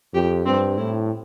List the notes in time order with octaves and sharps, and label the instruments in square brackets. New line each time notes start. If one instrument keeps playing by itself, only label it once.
[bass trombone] F2 [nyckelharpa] G4
[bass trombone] G2 [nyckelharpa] C4
[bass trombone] A2 [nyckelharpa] E4